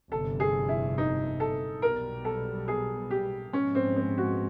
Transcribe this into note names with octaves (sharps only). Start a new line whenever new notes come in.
G1 F2 C3 A4
G#4
E4
D#4
A4
B1 B2 G3 B3 A#4
A4
G#4
G4
G#2 F3 G#3 B3 C#4
C4
C4
F#4